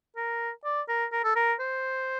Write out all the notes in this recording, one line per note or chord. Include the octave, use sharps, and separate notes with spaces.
A#4
D5
A#4
A#4
A4
A#4
C5